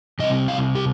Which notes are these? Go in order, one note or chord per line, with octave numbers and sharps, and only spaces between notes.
C3 G3 C4 D#5
F5
G4